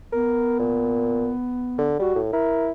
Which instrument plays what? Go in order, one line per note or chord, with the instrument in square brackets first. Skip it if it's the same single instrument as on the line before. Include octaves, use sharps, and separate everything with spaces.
[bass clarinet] B3 [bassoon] A#4
[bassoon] A#2
D3
[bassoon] G3 [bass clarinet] F#4
[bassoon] A2
[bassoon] E4 [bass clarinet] A#4